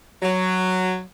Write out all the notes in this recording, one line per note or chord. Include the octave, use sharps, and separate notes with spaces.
F#3